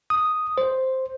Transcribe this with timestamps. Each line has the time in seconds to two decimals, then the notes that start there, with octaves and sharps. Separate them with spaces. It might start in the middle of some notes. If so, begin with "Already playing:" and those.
0.10 D#6
0.58 C5